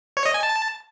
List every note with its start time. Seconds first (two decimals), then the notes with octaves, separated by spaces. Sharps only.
0.17 C#5
0.26 D#5
0.34 G#5
0.43 A5